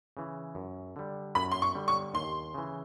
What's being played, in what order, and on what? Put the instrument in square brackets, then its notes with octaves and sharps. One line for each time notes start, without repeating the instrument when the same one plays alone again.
[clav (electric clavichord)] C#3 E3
F#2
D3 G3
[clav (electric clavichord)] F#2 [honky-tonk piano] B5
[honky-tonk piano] C6
C#6
[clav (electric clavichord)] D3 G3
[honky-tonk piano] C#6
[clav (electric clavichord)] D#2 [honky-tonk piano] C6
[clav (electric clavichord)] C#3 E3